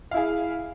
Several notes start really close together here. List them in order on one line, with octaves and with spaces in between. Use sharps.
F5 E4 G#4